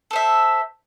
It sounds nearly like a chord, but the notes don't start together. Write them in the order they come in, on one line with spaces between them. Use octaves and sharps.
A4 C5 E5